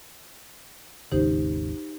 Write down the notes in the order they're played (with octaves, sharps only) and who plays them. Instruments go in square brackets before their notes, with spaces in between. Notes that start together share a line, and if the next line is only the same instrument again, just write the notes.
[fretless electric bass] G#1 D#2 C#3 [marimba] D#4 G4 C5